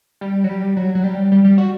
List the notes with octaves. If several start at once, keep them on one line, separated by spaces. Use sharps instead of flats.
G3
F#3
G3
F#3
F#3
G3
G3
G3
F#4